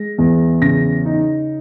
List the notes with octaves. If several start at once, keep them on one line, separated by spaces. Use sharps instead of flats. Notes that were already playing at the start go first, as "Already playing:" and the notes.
Already playing: G#3 A#6
E2
C#3 A#6
D#4